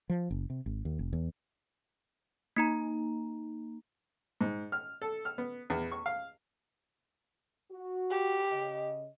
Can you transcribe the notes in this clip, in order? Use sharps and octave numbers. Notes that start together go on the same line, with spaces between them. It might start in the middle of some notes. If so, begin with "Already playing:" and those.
F3
F#1
C3
G#1
D#2
F1
E2
A#3 D#4 A#5
G#2
F6
A4
F6
B3
E2
C#6
F5
F#4
G4
C#3 D#5